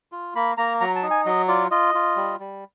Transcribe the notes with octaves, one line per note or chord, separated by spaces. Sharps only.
F4
A#3 B5
A#3 A#5
F#3 A#5
A5
D#4
G#5
F#3 D#5
F4 D5
F4 D#5
F4
G3
G3